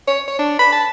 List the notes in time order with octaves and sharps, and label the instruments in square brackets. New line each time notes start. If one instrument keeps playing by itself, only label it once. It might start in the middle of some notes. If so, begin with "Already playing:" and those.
[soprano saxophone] C#5
C#5
D4
B5
A5